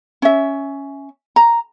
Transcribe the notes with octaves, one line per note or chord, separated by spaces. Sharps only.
C#4 E5
A#5